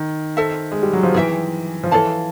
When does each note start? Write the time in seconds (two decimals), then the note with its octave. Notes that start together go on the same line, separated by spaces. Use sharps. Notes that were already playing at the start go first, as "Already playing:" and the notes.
Already playing: D#3
0.37 A4 C5 E5
0.72 G#3
0.83 G3
0.93 F#3
1.03 F3
1.14 E3 G#4 C#5 E5 G5
1.84 F3
1.91 E3 A4 C#5 F5 A5